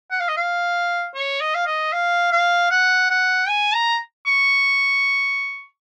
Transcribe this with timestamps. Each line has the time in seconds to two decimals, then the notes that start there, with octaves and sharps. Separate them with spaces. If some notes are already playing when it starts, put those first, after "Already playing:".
0.11 F#5
0.20 F5
0.29 D#5
0.37 F5
1.15 C#5
1.41 D#5
1.55 F5
1.67 D#5
1.93 F5
2.32 F5
2.71 F#5
3.10 F#5
3.49 G#5
3.75 A#5
4.26 C#6